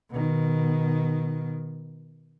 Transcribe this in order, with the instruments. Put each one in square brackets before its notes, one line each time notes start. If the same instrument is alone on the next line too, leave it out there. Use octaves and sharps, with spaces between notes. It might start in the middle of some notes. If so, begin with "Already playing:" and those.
[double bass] B2 D#3